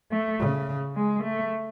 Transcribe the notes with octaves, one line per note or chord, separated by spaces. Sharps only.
A3
C#3
G#3
A3